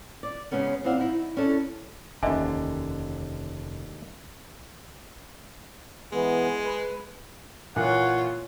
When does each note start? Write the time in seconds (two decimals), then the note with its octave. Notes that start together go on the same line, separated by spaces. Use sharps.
0.23 D5
0.51 C#3 E3 G#3 B3 C#4 D#4
0.84 D#2 E3 C4 D4 F5 F#5
0.98 D#4 E4
1.37 C#4 D4 E4 A4
2.23 F1 D#2 D3 C#4 D#5 E5 G#5
6.12 E3 G#3 B3
6.65 B4
7.76 A#2 E3 A#3 F4 C#5 F#5